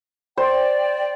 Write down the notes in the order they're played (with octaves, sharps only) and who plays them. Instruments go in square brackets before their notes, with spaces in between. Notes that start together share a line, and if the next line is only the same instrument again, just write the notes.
[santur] C5 [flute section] D5 G5